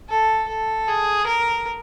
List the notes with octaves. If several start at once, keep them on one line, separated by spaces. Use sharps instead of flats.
A4
A4
G#4
A#4